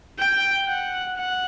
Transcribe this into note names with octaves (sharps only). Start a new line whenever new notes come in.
G5
F#5
F#5